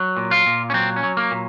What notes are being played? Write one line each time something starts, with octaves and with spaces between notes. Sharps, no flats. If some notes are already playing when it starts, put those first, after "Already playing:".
Already playing: F#3
A#2
F4
A#2
C#4
F#3 C4
C#4
F#3
A#3
A#2